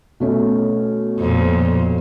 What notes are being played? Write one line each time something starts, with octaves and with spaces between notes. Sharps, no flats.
B2 A3 C#4
F2 A#2